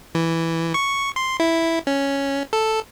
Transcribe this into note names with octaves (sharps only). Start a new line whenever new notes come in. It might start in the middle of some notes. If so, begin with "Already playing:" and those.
E3
C#6
C6
E4
C#4
A4